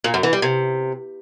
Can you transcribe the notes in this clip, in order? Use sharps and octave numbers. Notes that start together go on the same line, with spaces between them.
A#2
F#2
E3
G3
C3